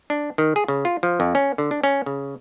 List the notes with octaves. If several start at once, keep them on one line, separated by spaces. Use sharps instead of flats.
D4
D#3
G#4
C#3
F4
F3
F2
C#4
D3
D4
C#4
C#3